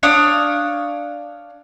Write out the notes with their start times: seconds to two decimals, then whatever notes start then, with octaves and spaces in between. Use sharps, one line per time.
0.03 D4 C#5 F5 D#6